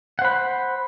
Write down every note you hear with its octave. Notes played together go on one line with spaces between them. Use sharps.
C5 F#5 B5